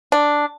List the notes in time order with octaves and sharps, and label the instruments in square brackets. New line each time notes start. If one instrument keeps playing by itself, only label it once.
[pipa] D4